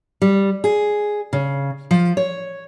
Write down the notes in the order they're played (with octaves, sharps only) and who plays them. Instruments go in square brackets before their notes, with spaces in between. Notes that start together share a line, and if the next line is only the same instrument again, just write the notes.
[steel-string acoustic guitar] G3
G#4
C#3
F3
C#5